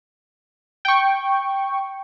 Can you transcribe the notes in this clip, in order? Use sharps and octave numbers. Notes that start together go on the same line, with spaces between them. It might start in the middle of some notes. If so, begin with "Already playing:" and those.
G5 C#6